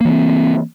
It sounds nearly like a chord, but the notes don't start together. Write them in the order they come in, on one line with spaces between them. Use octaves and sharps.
A#3 E3 C4